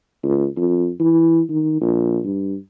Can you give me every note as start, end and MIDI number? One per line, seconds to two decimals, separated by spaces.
0.24 0.46 37
0.56 0.90 41
1.00 1.41 52
1.50 1.78 51
1.81 2.19 34
2.24 2.56 43